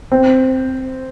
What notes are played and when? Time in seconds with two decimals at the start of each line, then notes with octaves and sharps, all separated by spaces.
0.12 C4